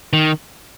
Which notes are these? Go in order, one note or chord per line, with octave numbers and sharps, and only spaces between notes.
D#3